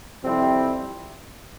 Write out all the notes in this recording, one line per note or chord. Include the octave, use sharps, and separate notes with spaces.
F2 C3 G3 C4 E4